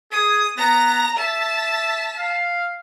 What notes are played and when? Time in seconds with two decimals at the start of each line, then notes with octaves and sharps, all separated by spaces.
0.12 G#4 D#6
0.57 B3 A#5 A#6
1.17 E5 A5 B6
2.18 F5